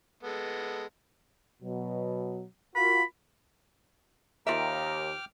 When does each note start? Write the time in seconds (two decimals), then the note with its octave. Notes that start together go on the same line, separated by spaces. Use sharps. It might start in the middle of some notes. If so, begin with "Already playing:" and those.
0.23 G#3 B3 A4
1.63 B2 F#3
2.76 F4 F#4 A#4 B5
4.47 D#2 F3 F4 E5 G5 A#5 D6 F6